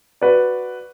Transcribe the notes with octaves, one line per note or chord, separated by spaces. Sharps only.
F#4 B4 D5